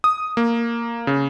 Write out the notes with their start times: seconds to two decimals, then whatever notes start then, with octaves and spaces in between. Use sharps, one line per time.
0.04 D#6
0.37 A#3
1.07 C#3